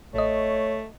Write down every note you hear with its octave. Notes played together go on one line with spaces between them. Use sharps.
A1 A3 C#5 D#5